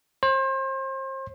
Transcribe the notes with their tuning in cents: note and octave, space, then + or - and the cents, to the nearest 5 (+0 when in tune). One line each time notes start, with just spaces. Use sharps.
C5 +35